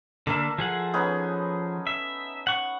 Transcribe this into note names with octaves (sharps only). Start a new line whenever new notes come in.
D3 A#3 D4 A4 A#4 E5
F3 G#4 F#5
B3 C#4 D#4
E5
F#5 C#6